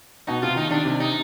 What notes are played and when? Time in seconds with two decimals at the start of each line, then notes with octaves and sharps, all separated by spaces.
0.27 B2 D#4
0.42 C3 F4
0.56 D#3 D#4
0.70 D#3 D4
0.85 C3
1.00 D#4